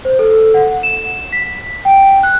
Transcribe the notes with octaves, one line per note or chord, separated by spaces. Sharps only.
C5
A4
F#5
E7
B6
G5
F#6